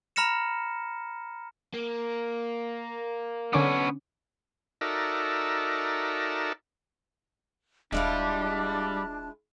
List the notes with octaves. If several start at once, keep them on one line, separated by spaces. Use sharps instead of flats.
A#5 B5 F6 A#6 C#7 E7
A#3
D3 B3 C#4 C#5 D6
D#4 F#4 A4 A#4 D5 E5
D#1 G3 G#3 D4 E4 F4 A5 F#6